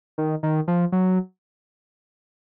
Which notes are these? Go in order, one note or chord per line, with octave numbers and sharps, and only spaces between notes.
D#3
D#3
F3
F#3